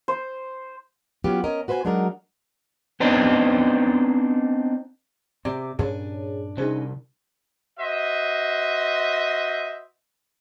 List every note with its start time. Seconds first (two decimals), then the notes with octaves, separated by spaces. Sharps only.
0.08 C5
1.24 F#3 B3 C#4 F4 G4
1.44 C#4 A#4 D#5
1.68 F#4 B4 C5 F5 G#5
1.85 F#3 G#3 D4 D#4 F#4 A#4
3.00 B3 C4 D4 D#4
5.45 C3 C4 D5 D6
5.79 G2 A#2 C#4 D4 G#4 C#5
6.58 C2 C#4 D#4 G#4 C5
7.80 F#4 C5 D#5 E5